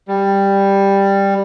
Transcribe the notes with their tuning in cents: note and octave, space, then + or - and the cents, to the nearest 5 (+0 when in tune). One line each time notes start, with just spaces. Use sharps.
G3 +10